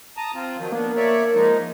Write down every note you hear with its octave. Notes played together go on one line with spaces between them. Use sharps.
A5 A#5 D#6
C4 F4
D#3 F3 F#3
A#3 B3 D4
C#5 D5 E5
F3 G#3 D#4